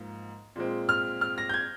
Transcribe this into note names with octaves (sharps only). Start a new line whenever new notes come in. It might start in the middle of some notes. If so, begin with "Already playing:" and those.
Already playing: G#2 F3 A#3
A#2 G#3 C4
F6
F6
A#6
G6
G#6